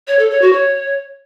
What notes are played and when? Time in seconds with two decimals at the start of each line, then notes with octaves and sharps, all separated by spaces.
0.08 C#5
0.19 A4
0.30 C#5
0.41 F#4
0.53 C#5